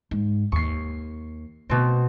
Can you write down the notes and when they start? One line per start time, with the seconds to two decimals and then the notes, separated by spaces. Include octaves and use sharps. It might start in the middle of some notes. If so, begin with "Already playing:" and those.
0.11 G#2
0.52 D#2 C#6 C7
1.70 B2 A3 C4